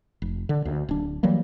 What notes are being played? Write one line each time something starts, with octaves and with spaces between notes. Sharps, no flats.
F1
D3
D2
D1 D4
E3 F#3 G3 A#3